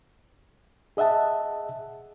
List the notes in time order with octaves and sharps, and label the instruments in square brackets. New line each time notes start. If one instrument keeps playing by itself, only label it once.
[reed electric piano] G#4 D#5 E5 F#5 A5